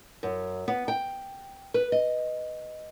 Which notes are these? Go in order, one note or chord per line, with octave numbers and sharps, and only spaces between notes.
F#2
B3
G5
B4
D#5